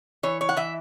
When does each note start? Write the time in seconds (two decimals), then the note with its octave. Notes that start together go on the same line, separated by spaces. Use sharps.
0.23 E3 C#5
0.41 C#5
0.49 F#5
0.57 E3 E5